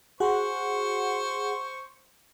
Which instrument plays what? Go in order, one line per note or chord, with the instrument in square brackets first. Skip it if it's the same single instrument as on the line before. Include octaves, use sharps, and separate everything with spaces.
[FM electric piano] F#4 G#4 F#5 [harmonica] C5 C#6